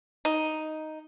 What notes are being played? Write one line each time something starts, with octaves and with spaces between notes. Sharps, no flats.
D#4